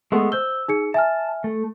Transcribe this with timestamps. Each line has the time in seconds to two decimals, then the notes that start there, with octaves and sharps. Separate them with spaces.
0.12 G#3 A3 B3
0.32 C5 E6 G6 G7
0.68 D#4 G#4 C#7
0.94 E5 G#5 A5 F6
1.44 A3